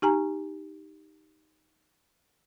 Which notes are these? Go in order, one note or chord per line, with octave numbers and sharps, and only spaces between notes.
D#4 G4 G#5 A#5